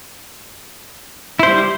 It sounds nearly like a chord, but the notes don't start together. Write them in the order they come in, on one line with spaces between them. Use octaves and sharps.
E4 C5 G3